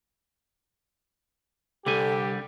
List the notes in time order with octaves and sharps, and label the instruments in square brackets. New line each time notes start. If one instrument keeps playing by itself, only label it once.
[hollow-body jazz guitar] C2 [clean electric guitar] D3 G3 G#5 [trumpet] G4 [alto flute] A4